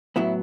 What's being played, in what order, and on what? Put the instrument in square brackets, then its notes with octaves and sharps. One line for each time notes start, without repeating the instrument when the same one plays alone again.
[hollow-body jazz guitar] A2 F#3 B3 E4